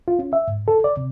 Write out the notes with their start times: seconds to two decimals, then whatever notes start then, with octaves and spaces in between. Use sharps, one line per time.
0.08 F4
0.19 C#4
0.33 E5
0.48 G#2
0.68 A4
0.84 D5
0.97 C3